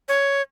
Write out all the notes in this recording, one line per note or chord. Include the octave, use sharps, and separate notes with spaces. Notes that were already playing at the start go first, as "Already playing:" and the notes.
C#5